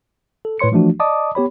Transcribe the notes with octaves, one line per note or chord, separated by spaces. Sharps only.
A4
A2 B4 C#5 C6 C#7
E3 F3 A3 D4 F#4
D5 D#5 A5 D6 D#6
B3 G4 C#5 B5